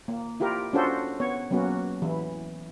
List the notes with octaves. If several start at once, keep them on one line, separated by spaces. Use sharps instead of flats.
A#3
E4 F4 G4 A#4
C#4 D4 F4 F#4 A4 C5
B3 C#5
F#3 A#3 B3 C#4 F#4
E3 E4